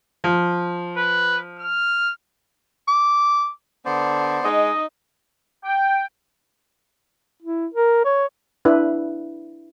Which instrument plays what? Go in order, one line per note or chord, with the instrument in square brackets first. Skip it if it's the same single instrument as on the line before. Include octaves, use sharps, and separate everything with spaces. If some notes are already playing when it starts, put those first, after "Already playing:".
[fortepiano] F3
[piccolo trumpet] B4
F6
[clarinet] D6
[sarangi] D3 [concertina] B3 C5 D5
[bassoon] G#3 [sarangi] D#4 [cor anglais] D#5
[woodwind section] G5
[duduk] E4
A#4
C#5
[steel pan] D4 E4 B4